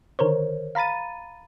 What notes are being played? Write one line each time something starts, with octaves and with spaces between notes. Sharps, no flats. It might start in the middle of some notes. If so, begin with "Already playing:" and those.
D3 D#3 A#4 C5 C#5
F5 A#5 B5 A6 D#7